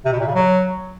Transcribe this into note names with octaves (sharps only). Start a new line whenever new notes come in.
C3
B2
A#2
C#3
F#3